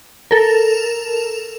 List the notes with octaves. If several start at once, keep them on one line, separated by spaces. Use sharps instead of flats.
A4 A#4